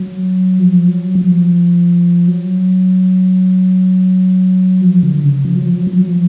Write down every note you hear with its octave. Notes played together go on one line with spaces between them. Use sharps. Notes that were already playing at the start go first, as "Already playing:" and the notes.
Already playing: F#3
F3
F#3
F3
F#3
F3
D3
C#3
F3
F#3
F3
F#3
F3
F#3
F3